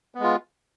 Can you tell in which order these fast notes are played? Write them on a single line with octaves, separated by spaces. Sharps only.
B3 G#3 F4